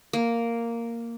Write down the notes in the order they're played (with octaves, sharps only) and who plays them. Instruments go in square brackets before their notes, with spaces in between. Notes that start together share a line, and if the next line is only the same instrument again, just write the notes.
[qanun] A#3